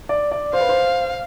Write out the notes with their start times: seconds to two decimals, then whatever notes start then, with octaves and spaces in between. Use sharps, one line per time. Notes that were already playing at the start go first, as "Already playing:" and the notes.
0.09 D5
0.32 D5
0.53 C5 F5
0.61 B4
0.69 C5